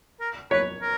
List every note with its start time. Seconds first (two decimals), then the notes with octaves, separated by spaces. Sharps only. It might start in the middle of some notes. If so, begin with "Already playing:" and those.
0.20 A#4
0.51 B4 C#5
0.82 A#4